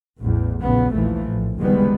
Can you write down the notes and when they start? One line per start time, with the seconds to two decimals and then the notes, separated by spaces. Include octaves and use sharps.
0.20 A1 E2
0.63 A#1 E2 C#3 B3
0.94 A#1 D#2 E3 F3 A3
1.27 A#1 A2
1.59 F1 C#2 D#3 G3 G#3 B3